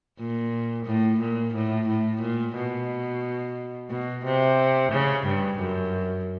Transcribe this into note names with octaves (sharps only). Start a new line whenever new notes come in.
A#2
A2
A#2
A2
A2
A#2
B2
B2
C3
C#3
G2
F#2